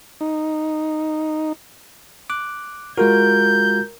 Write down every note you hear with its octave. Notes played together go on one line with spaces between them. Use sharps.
D#4
D6 F#6
G#3 F4 F#4 A#4 G6